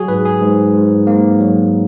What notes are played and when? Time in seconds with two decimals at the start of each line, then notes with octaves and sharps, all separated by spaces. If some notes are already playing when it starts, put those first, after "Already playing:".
Already playing: F#3 F#4 G#4
0.08 G#2 B4
0.25 G#4
0.42 G#2
0.74 G#2
1.07 G#2 A#3
1.40 F#3